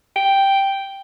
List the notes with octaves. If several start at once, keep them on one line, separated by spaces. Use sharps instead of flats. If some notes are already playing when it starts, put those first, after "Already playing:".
G5